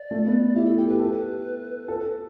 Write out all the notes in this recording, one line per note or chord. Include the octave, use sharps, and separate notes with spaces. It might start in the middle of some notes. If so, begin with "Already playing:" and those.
Already playing: D5
A3
B3
E4 G4
A4
G4 A4
G4 B4
A4
A4